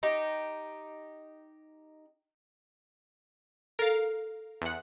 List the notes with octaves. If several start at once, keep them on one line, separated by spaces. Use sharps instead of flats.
D#4 G4
A4 A#4 F5
E2 F#5